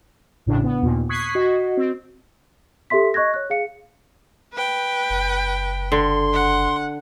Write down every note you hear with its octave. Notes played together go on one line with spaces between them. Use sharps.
A1 A2 C#3 D4
B3
D#2 A#2
C#6 D#6 F#6 G#6 B6 C7
F#4 D#5
C4
G4 A4 E5 C6 B6
D#5 C#6 F#6 G#6 A#6
C#5 F#6
G#4 F5 C#7
B4 G5
F#1
D3 C6
F#5